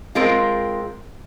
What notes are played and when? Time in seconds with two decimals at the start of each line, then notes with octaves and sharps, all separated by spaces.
0.15 G#3 C4 F4 A#4